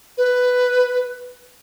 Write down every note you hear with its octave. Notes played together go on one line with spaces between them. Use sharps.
B4